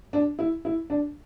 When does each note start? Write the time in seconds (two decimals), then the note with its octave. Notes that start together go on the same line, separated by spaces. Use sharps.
0.13 D4
0.39 E4
0.65 E4
0.90 D4